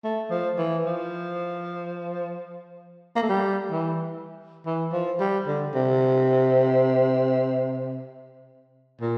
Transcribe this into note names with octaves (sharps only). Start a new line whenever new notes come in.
A3
F3
E3
F3
A#3
A3
G3
E3
E3
F3
G3
D3
C3
A#2